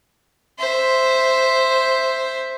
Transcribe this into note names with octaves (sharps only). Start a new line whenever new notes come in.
C5 E5